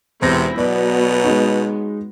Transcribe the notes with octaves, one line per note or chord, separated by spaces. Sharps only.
E1 C3 B3 C4 E4 A#6
B2 F#3 B3 D5
G#3 D#4